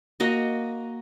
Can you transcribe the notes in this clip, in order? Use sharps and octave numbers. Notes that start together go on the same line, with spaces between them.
A#3 F#4 D#5